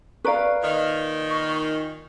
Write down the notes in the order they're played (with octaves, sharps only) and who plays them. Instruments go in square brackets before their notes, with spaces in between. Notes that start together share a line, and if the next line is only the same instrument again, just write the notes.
[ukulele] B4 F5 [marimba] D5 A#5 C#6
[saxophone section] A#2 D#3
[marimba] C#6